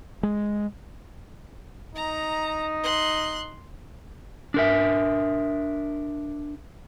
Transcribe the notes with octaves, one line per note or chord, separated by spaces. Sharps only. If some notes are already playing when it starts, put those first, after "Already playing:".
G#3
D#4 A#5
C6 F#6
D4 A#4 E5